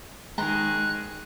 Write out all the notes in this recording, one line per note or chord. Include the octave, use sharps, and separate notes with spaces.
D#3 G#3 D#4 G#4 C5 A#5 B5 F#6